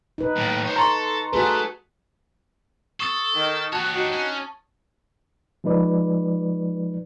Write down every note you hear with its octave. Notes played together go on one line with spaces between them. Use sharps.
D#4 B4
D#2 A2
C5 C#5
A4 A#5 C6 C#6
A3 F#4 G#4 B4
A4 C#6 D#6 A6
D#3
F#4 G4 C#5 A5
D4 D#4 F#4
C#4
F3 G#3 D#4 B4 D5